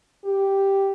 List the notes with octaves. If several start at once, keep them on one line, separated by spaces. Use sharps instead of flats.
G4